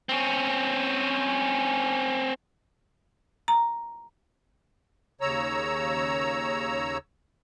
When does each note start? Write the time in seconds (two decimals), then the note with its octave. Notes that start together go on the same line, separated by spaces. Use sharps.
0.09 C4 C#4
3.48 A#5
5.21 D#2 C#3 C#5 A#5 E6